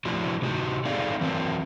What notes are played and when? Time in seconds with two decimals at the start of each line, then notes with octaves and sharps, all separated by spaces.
0.05 F3 A3 D4 E4 F#4
0.42 C3 D#4 F#4 G4
0.85 A3 C4 D#4 G#4 D5 F5
1.21 E3 F#3 C4 A#4